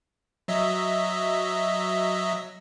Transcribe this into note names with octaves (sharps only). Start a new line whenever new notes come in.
F#3 D#5 E5